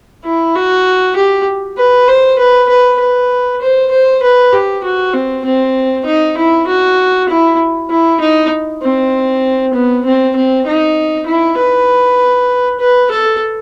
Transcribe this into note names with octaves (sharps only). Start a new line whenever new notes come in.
E4
F#4
G4
B4
C5
B4
B4
B4
C5
C5
B4
G4
F#4
C4
C4
D#4
E4
F#4
E4
E4
D#4
C4
B3
C4
C4
D#4
E4
B4
B4
A4